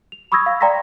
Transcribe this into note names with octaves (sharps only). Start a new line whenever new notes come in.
F7
B5 C#6 D#6 E6 G#6 A#6
F5
D5 G5 A#5 C6 A#6 B6